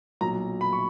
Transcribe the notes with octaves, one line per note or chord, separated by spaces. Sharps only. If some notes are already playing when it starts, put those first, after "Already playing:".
B1 A#2 A#5
B5
C#6